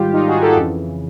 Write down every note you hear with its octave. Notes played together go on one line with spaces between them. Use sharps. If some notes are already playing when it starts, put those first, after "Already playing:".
Already playing: G#2 D#3 G3 F4 G4
D#4 F4
F#4 G#4
G4 A4
F2 C#3 E3